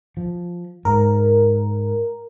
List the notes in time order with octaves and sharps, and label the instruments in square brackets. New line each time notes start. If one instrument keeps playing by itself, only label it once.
[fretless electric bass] F3
[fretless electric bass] G#2 [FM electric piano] A#4